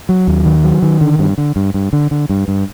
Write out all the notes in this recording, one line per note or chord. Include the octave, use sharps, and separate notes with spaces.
F#3
D#2
D#3
F#3
D#3
D3
G2
D3
G2
G2
D3
D3
G2
G2